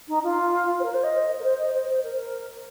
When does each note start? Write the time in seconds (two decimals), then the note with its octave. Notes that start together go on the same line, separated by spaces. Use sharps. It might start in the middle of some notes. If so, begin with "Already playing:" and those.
0.08 D#4
0.23 F4
0.79 C5
0.83 A#4
0.94 C5
1.03 D#5
1.40 A#4
1.44 C5
1.59 D#5
1.74 C5
1.89 C5
2.03 A#4